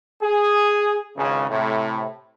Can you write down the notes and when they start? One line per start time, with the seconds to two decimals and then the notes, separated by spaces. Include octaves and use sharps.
0.22 G#4
1.17 G#1 C#2 C#3
1.50 A2 C3